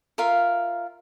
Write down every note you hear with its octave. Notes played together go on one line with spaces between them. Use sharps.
F4 A#4 E5 F5